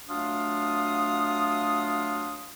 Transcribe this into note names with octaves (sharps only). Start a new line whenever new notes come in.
F#3 A3 D4 F4 F5 D#6